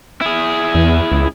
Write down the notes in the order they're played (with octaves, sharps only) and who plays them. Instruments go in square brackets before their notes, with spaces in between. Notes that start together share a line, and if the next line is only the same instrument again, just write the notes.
[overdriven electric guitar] E4 G#4
[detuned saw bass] E2
C#2